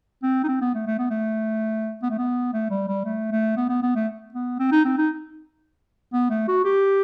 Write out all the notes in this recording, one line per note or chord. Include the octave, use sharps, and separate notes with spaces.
C4
D#4
C4
B3
A3
A3
B3
A3
B3
A3
B3
A3
G3
G3
A3
A3
B3
B3
B3
A3
B3
C4
D#4
C4
D#4
B3
A3
F#4
G4